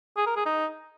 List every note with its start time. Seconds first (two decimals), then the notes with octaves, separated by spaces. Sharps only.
0.17 G#4
0.26 A#4
0.36 G#4
0.46 D#4